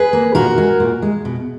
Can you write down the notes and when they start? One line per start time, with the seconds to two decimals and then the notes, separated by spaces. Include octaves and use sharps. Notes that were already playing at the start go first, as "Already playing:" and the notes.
Already playing: G#4 B4
0.13 A#3
0.35 A#2 F#4 A#4
0.58 G#3
0.80 A#2
1.02 G#3
1.25 B2